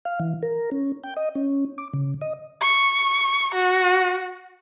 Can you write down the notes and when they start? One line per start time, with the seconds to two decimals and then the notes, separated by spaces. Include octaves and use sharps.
0.05 F5
0.20 E3
0.42 A#4
0.71 C#4
1.04 G5
1.17 D#5
1.35 C#4
1.78 D6
1.93 C#3
2.21 D#5
2.61 C#6
3.55 F#4